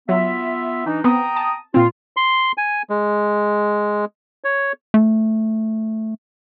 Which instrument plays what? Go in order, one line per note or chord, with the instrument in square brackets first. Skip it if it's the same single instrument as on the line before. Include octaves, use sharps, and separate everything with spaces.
[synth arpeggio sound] F#3 [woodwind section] B3 F4 E5
[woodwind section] E3 D4 D#4
[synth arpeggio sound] B3 C4 [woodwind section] G5 A#5 D#6
[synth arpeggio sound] A5
[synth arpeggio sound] A#2 C4 [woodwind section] F4
[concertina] C6
G#5
G#3
C#5
[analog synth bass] A3